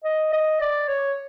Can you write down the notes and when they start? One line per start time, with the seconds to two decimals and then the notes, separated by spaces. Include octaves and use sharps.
0.04 D#5
0.33 D#5
0.60 D5
0.88 C#5